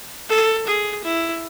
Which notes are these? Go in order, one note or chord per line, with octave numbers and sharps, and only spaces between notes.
A4
G#4
E4